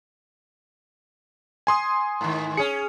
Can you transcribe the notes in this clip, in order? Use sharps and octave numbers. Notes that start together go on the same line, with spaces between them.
G#5 C6 D#6
G#2 D#3
C#4 G#4 C#7